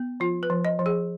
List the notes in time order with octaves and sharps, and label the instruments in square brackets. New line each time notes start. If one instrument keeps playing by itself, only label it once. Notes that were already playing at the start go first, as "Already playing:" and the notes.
Already playing: [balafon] B3
F3 F4
B4
F3
D#5
F3
G#4